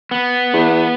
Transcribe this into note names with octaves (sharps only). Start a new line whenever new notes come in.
B3
E2